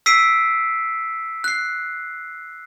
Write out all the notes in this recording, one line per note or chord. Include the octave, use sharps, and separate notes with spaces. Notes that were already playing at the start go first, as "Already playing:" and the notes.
E6 B6 C7 D7 D#7
F#6 C7